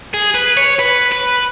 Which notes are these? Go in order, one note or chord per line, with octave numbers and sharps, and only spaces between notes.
G#4
B4
C#5
B4
B4